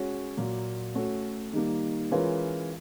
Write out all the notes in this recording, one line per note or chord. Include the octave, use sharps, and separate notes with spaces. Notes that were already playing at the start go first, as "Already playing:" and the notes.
Already playing: G#3 C#4 F#4
A#2 F#3 A#3
A3 C#4 F#4
D#3 G3 A#3
E3 G#3 C#4 F4 A#4